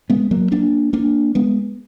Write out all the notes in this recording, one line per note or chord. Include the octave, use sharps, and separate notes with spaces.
G#3 B3
F#3 A#3
A#3 D4
A#3 D4
G#3 B3